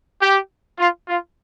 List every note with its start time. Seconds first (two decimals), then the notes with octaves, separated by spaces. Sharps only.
0.21 G4
0.79 F4
1.08 F4